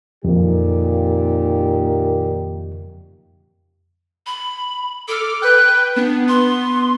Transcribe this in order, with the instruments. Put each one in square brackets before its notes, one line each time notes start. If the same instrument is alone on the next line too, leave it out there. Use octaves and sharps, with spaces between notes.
[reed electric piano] F2 [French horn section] A#2 D#3 G4
[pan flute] B5
[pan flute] A4 [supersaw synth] D6 F6
[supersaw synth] B4 G5 [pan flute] F#6
[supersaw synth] B3 [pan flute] D4
[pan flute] C6